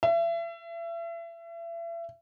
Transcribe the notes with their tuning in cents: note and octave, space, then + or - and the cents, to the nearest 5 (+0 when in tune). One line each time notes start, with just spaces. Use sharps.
E5 +35